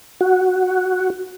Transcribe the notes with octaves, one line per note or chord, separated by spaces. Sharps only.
F#4